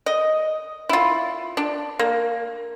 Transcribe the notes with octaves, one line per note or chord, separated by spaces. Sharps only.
D#5
E4 F4
D4
A#3